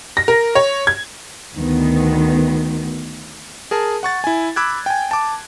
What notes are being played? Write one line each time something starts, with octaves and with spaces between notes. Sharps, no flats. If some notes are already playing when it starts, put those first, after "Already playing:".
A#6
A#4
C#5
G#6
D2 D#3 B3
G#4 A#4 A5
F#5 C#6 A6
E4 G#5
B5 D6 E6 F#6 G#6
G5 G#5
A5 D6